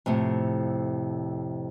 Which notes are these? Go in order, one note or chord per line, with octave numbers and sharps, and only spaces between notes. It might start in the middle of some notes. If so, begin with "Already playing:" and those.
F2 A2 C3